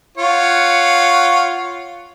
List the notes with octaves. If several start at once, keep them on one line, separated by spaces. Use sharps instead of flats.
F4 C#5 F#5